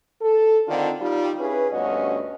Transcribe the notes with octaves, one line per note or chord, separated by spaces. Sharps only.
A4
D3 D#3 C4 D4 F4
G3 D#4 F4
C#4 E4 G#4 B4
D2 G2 B3 C#4 F#4 D#5